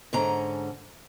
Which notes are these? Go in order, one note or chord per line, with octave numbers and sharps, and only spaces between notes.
G#2 D3 C#4 A#5